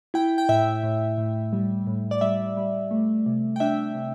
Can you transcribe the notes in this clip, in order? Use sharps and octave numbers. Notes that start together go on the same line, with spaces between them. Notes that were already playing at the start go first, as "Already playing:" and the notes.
E4 G5
G5
A2 E5
A2
A2
G3
A2
D5
G3 E5
G3
A3
C3
G5
D4 E5
C3